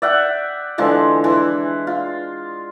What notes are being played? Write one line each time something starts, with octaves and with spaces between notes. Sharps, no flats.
D5 E5 F#5 G5
D3 E3 F3 G#3
E3
F4